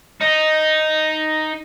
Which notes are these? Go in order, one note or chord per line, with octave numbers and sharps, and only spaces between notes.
D#4